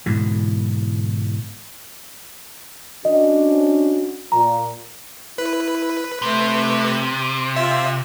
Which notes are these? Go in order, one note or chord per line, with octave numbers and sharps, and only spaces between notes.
G#2 B2 D3 E3
C#4 D4 F#4 D#5
A#2 A#5
E4 B4
C3 A3
F4 E5